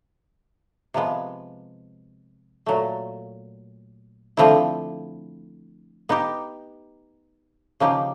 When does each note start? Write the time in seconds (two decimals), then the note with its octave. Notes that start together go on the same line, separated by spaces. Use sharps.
0.94 C3 F3 G#3 B3
2.66 A#2 F#3 A3
4.37 D3 F3 A3 C4 E4
6.09 B3 D#4 G4
7.80 C#3 F3 A#3 D#4 G4